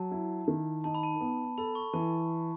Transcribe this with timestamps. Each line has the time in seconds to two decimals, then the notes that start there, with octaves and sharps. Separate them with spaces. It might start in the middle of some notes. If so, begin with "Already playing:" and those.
Already playing: F#3 A5
0.11 E4
0.48 D#3
0.84 D#4 A5
0.95 B5
1.03 A5
1.20 B3
1.58 A4 B5
1.75 C#6
1.93 E3 A5